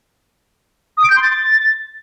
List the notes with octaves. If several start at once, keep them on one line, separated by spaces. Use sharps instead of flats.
D#6
D7
G6
C6
A6